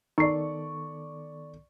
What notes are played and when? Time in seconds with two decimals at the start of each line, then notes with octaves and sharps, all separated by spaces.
0.18 D#3 B3 D#4 A4 D5 C#6 C7